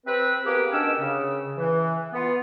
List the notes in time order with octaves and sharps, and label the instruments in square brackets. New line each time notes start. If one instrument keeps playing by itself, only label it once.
[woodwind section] C4 B4
A#3 B3 G4 G#4 B4
B2 D#3 C#4 D4 G5 E6
C#3
E3
B3 F4